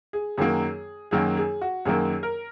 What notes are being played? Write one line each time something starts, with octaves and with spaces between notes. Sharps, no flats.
G#4
F#2 D#3 F#3 A#3 G#4
F#2 D#3 F#3 A#3 G#4
G#4
F#4
F#2 D#3 F#3 A#3 G#4
A#4